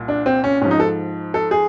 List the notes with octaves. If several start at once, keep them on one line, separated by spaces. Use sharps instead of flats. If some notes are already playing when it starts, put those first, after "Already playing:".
Already playing: C2 A#2
D4
C4
C#4
G#2 F3 C#4
D#4
A4
A4
G#4